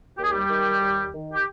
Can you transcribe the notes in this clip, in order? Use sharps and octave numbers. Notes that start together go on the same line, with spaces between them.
D#2 G4
G#4
G3 G4
D#3
D#2
D#3
G4